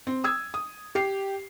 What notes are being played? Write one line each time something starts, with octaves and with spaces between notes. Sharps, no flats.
C4
D#6 E6 G#6
D#6
G4 C7